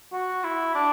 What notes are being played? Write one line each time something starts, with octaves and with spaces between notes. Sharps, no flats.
F#4
E4
D4